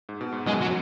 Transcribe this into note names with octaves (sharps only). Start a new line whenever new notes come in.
G#2
B2
G#2
F#2 B2 G#3
F#3